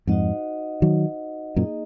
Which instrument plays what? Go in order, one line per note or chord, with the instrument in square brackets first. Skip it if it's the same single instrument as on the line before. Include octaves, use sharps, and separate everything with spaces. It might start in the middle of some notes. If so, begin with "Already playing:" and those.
[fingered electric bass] F2 G#2 [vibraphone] D#4 F#4 C5 D#5 F#5
[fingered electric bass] D#3 F#3
[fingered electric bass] F#2 A#2 [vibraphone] A#3 D#4 G#4 D#5